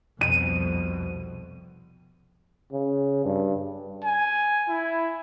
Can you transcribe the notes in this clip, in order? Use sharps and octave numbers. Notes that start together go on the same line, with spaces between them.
C2 F2 B2 D#7
C#3
G2
G#5
E4